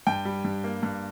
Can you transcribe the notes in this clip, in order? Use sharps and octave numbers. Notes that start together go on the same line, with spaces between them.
G2 G5
G3
G2
A#3
G2